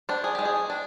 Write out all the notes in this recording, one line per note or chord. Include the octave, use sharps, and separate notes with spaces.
D4 C5
G#4
G#3 G4
G#4
D4